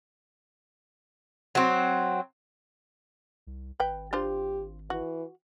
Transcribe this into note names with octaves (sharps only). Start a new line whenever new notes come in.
F#3 C4
C2
G#1 B4 G5
D4 F4 G4 C5
E3 F#4